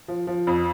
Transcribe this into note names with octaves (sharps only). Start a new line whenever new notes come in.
F3
F3
F2